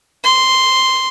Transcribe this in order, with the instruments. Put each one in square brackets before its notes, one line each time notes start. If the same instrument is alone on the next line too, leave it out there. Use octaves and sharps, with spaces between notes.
[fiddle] C6